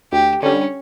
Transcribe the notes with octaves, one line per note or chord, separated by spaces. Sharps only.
D2 G4
D3 G3 C#4